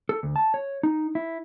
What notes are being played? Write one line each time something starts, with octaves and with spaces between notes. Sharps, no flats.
A4
D2
A5
C#5
D#4
E4